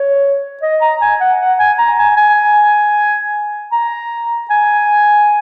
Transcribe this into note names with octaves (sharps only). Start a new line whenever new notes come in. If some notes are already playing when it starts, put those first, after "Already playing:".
Already playing: C#5
D#5
A#5
G#5
F#5
F#5
G#5
A#5
G#5
G#5
A#5
G#5